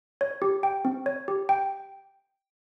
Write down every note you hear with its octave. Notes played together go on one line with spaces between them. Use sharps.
C#5
G4
G5
C4
C#5
G4
G5